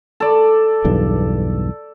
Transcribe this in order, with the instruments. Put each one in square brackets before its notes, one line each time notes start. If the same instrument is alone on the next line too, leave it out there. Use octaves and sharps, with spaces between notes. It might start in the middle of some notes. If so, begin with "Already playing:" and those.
[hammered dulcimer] A4 D5
[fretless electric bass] B1 E2 G2